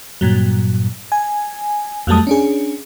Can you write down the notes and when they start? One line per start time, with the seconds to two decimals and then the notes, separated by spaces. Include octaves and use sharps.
0.21 G2 A#2 F#3
1.12 G#5
2.07 F2 F#3 G3 A3 A5 D#6
2.27 C#4 D4 G#4